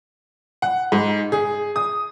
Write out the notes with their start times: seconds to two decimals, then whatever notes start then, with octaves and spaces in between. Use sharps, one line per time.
0.62 F#5
0.92 G#2
1.32 G#4
1.76 D#6